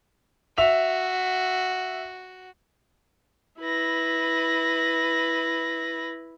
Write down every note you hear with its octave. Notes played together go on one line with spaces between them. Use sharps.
F#4 E5 F7
E4 B4 A#6